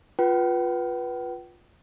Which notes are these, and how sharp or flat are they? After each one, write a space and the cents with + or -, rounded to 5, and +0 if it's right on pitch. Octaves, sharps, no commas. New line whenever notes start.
F4 +10 B4 -15 G5 -45